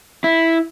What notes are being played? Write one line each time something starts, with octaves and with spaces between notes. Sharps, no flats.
E4